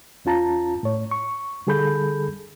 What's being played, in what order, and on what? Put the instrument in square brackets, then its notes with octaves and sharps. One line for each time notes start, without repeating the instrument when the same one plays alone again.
[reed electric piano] E2 C#4 F4 A5 A#5
A2 C#5
C#6
D3 G3 G#4 A4 B5 G6